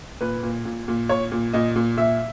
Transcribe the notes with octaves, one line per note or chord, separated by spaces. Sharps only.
A#2 B4
A#2
A#2
A#2
A#2 C#5
A#2
A#2 D#5
A#2
A#2 E5